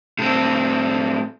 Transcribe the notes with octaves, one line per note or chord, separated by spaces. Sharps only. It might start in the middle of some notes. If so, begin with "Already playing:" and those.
A2 C4